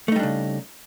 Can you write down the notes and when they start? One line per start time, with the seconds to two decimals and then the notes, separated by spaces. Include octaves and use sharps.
0.08 A3
0.12 D#4
0.16 G3
0.19 D4
0.23 C#3